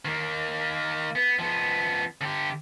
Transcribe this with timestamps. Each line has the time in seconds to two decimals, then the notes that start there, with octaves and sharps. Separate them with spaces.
0.05 D#3 A#3
1.15 B3
1.39 F3 B3
2.21 D3 G4